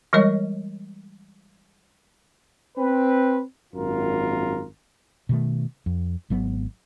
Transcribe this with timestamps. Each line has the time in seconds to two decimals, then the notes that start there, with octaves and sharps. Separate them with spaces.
0.13 E3 G3 G#3 A#4 C#5 D#5
2.78 C4 B4
3.74 G#1 F#2 F4 A#4
5.29 B2 D#3 A3
5.86 F2
6.30 G#1 F#3 B3